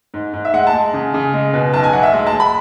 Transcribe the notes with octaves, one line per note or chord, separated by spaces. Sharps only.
G#2
G#2
E5
G#3 F#5
A5
G#3
C#3
C#3
G#3
B2
B1 A5
G#5
B1 F#5
E5
G#3
A5
G#3
B5